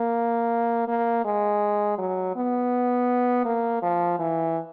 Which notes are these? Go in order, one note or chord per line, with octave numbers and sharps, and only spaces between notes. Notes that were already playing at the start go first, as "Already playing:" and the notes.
Already playing: A#3
A#3
G#3
F#3
B3
A#3
F3
E3